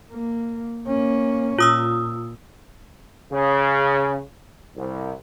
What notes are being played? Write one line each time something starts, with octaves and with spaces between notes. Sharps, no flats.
A#3
A#3 C#4
A#2 F4 D#6 E6
C#3
C2